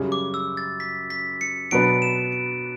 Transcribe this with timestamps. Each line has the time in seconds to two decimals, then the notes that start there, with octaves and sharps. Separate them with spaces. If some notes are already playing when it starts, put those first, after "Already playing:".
Already playing: F#2 C#3 G3 C#4
0.12 D6
0.34 E6
0.57 A6
0.80 B6
1.10 B6
1.41 C#7
1.71 B2 F#3 B3 D4 D7
2.02 E7
2.32 D7